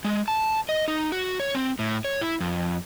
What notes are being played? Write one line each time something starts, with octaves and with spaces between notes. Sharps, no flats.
G#3
A5
D#5
D#4
F#4
C#5
C4
A2
C#5
E4
F2